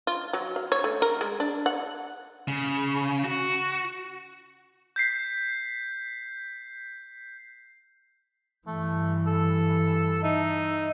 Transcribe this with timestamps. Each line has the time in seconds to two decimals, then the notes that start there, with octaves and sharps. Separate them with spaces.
0.07 F4
0.33 F#3
0.56 F5
0.72 C#5
0.84 A3
1.02 A#4
1.21 G#3
1.40 D4
1.66 F#5
2.48 C#3
3.24 F#4
4.96 G6 B6 C7
8.67 G2 E3 A3
9.27 A4
10.23 D#4 E5